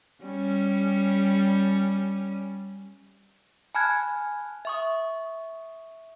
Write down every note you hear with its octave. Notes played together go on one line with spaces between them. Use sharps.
G3 C#4
G#5 A5 B5 F6 F#6 G#6
E5 C#6 D#6